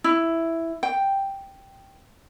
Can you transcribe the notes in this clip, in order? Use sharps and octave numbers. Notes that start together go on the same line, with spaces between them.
E4
G5